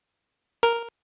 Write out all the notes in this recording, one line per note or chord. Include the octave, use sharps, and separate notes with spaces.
A#4